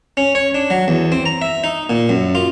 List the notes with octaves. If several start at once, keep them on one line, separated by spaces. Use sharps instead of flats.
C#4
C#5
D4
F#3
E2
C4
A#5
E5
D#4
A#2
F#2
F4